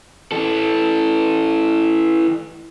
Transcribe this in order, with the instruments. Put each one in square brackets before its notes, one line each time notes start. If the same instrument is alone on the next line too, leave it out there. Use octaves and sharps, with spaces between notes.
[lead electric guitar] E3 A4